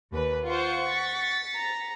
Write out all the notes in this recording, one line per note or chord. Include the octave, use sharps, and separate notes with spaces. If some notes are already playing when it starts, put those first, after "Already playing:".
D#2 B4
F4 C5 F#5 C#6
A6 B6 C#7
A#5